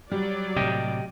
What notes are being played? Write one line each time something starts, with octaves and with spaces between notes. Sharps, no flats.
F#3 G3 D5
A2 C3 G4 D#5 G5